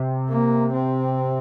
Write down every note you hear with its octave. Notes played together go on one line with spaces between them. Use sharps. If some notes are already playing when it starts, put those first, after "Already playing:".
Already playing: C3
A#3
C4